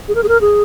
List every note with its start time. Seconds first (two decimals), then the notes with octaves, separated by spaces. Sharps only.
0.08 G#4
0.15 A#4
0.23 G#4
0.29 A#4
0.41 G#4